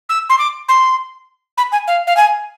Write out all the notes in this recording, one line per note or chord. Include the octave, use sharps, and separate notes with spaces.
E6
C6
D6
C6
B5
G#5
F5
F5
G#5